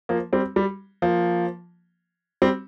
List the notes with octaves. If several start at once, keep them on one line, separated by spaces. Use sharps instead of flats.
F3 A#3
G3 C4
G3
F3 A#3
G3 C4